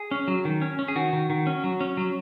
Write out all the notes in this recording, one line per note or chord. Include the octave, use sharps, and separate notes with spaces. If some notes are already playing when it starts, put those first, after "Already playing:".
Already playing: G#4
C#4
F#3
D#3
C#4
C#4
G#4
D#3 F#4
D#3
D#3
C#4
F#3
C#4
F#3